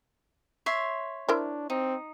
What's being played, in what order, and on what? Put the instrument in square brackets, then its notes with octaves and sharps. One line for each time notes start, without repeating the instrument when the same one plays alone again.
[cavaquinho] C#5 E5 C6
[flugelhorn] D4 [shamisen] E4 A#4 C5
[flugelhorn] C4 [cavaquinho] D#4